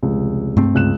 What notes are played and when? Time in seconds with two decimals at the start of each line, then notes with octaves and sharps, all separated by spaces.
0.03 F1 C#2
0.57 G2 A3 C4
0.75 C#2 F#6 E7